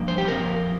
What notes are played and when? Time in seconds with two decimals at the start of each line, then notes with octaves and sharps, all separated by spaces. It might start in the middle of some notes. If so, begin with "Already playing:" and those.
Already playing: G2 F3 A#3
0.08 C5
0.18 G4
0.28 F2 F3 C4 A#4